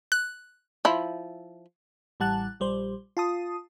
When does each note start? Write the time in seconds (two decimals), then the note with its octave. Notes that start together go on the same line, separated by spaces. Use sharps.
0.12 F#6
0.85 F3 E4
2.20 A1 G3 F#5 A5 F#6
2.60 A#1 G3 C5
3.17 F4 A5 D#6